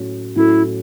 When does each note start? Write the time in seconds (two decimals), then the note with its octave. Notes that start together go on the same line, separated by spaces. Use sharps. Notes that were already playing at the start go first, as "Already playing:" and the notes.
Already playing: A2 F#3 C#4 F#4 C#5
0.36 A2 F#3 C#4 E4 F#4 A4